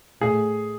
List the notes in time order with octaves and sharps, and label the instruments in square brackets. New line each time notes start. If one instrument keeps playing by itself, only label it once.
[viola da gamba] A2 [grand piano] G#4